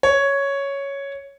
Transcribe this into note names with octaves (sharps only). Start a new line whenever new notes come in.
C#5